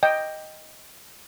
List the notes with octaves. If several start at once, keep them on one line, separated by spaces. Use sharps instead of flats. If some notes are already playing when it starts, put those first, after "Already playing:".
D#5 G5